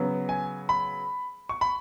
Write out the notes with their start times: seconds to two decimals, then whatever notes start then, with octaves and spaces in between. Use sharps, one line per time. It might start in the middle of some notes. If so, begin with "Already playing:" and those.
Already playing: C#3 F#3 B3
0.29 G#5
0.69 B5
1.49 C#6
1.61 B5